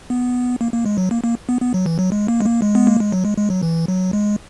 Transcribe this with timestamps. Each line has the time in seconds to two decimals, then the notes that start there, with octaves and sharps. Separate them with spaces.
0.10 B3
0.61 A#3
0.73 A#3
0.86 G#3
0.98 F#3
1.11 A#3
1.24 A#3
1.49 B3
1.61 B3
1.74 F#3
1.86 E3
1.99 F#3
2.12 G#3
2.28 A#3
2.41 G#3
2.45 A#3
2.62 G#3
2.75 B3
2.87 A#3
3.00 G#3
3.12 F#3
3.25 G#3
3.37 G#3
3.50 F#3
3.63 E3
3.88 F#3
4.13 G#3